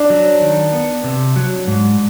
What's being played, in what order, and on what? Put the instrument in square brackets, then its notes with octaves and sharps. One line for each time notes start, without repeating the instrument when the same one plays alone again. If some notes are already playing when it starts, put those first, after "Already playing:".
Already playing: [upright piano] D4
[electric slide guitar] F#3
D#3
B3
C3
F#3
G#2